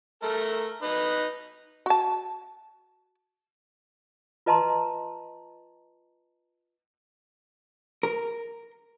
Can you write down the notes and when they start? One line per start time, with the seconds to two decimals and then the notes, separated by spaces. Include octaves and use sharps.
0.23 A3 A4 A#4
0.83 D#4 B4
1.86 F#4 A5
4.46 F4 B4 D#5 A5 A#5 C6
8.03 A#4